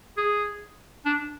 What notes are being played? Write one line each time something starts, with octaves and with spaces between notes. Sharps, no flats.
G#4
D4